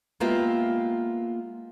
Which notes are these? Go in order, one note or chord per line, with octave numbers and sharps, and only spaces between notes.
G#3 A#3 B3 F4 G4 E5